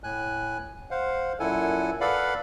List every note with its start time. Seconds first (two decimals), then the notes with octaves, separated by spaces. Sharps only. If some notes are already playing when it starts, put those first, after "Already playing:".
0.04 A2 G#5 F#6
0.91 C5 F5 F#5
1.40 F#2 A#2 E4 A4 F#5 G#5
2.01 A4 B4 D5 F5 F#5 B5